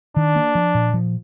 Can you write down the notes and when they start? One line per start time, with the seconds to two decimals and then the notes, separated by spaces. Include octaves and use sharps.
0.17 D#3 D4
0.36 A#3
0.55 F3
0.75 A#2
0.94 F3